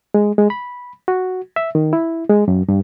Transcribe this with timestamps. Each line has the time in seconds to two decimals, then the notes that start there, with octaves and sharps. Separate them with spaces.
0.14 G#3
0.38 G#3
0.50 B5
1.08 F#4
1.56 E5
1.75 D#3
1.93 E4
2.29 G#3
2.48 F#2
2.69 G2